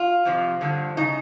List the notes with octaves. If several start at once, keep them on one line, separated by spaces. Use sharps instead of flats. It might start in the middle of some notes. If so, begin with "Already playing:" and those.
Already playing: F4
F2 C3 F3
G2 D3 F3
C#3 D#4